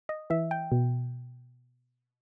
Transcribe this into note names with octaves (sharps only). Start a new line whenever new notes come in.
D#5
E3 E5
G5
B2